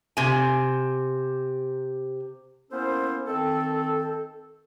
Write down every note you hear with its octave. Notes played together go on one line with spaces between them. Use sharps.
C3 G#5
A#3 B3 C#4 E4 A4 C5
D#3 C4 A4